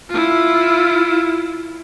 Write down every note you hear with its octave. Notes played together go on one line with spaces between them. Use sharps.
E4 F4